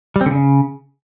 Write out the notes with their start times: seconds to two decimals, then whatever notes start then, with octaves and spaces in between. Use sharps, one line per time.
0.16 G3
0.21 C4
0.26 D3
0.31 C#3